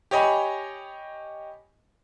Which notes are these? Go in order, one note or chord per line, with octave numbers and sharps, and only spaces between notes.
G4 C#5 D#5 G#5 B5